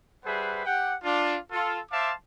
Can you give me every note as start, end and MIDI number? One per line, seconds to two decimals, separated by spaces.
0.24 0.64 55
0.24 0.64 68
0.24 0.64 71
0.24 0.64 72
0.24 0.64 76
0.24 0.64 78
0.65 0.94 67
0.65 0.94 78
0.65 0.94 79
1.03 1.37 62
1.03 1.37 65
1.52 1.79 65
1.52 1.79 69
1.91 2.13 72
1.91 2.13 76
1.91 2.13 77
1.91 2.13 81
1.91 2.13 84
1.91 2.13 86